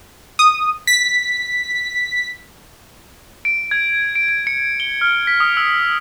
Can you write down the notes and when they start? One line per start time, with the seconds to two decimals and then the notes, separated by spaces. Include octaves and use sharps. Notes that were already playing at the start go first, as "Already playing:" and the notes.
0.39 D#6
0.87 B6
3.45 D7
3.71 G#6
4.15 D7
4.29 D7
4.47 C#7
4.80 G7
5.01 F6
5.27 B6
5.40 D#6
5.57 E6